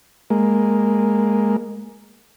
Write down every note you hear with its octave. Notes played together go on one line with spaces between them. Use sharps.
G#3 A#3